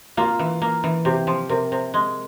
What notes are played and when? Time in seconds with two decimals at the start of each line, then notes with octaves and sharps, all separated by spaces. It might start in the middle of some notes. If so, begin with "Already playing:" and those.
0.17 A#3 F4
0.39 E3
0.62 A#3
0.84 E3
1.05 C3 G4
1.27 F3
1.49 C3 A#4
1.72 C3
1.94 G#3